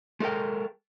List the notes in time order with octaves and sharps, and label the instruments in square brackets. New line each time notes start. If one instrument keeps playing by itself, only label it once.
[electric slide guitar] G#3 A4 A#4 G5